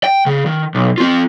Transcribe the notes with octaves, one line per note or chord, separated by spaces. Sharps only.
G5
C#3
D#3
B1
C4 F4